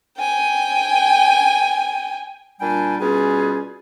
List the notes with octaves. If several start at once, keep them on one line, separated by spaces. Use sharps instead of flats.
G5 G#5
A#2 G3 D4 G5 G#5
B2 G3 C#4 F4 G#4